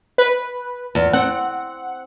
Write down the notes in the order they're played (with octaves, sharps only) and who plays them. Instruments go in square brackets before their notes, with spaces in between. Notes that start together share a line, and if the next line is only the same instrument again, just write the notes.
[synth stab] B4
[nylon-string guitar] E2
[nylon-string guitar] C4 [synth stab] F#5